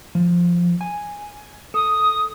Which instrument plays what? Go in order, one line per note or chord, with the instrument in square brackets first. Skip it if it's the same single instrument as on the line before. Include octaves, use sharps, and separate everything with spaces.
[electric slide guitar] F3
G#5
[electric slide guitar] A4 [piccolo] D#6